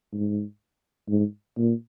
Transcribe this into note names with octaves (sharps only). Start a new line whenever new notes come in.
G#2
G#2
A#2